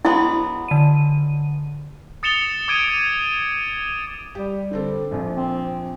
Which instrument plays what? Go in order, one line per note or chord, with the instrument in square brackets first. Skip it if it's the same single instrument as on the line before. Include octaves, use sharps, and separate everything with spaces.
[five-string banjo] F#3 G#3 B3 [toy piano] E4
[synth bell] D3 D#7
[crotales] D#6 A6 C#7 E7 F7 G7
D6 D#6 G#6 D7 D#7
[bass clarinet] G3 [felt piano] G4
[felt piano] D3 C4 A4
A#1 F2
[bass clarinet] C4